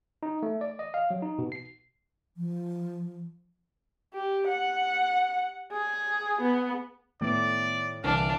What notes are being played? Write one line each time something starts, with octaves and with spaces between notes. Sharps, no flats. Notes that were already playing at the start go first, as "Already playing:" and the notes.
D#4
A3
D5
D#5
F5
F#3
D#4
B2
C7
F3
G4
F#5
G#4
B3
A2 D#3 A3 B3 D5
C2 D3 E3 D4 F5